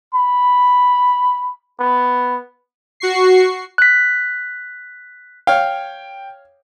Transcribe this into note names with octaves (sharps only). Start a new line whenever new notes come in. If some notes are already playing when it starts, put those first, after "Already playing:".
B5
B3
F#4 C#6 C7
F#6 B6
C#5 F5 G5